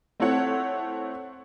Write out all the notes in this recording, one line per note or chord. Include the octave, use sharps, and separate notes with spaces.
A3 C4 E4 A4 C#5 F#5